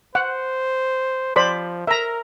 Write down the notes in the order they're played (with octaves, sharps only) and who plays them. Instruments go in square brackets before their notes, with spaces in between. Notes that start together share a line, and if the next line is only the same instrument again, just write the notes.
[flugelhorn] C5 [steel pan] F#5
[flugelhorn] F3 [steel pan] C5 D5 B5
[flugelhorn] A#4 [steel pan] E5 A#5